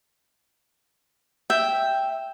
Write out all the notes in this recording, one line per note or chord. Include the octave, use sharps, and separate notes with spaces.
E5 G5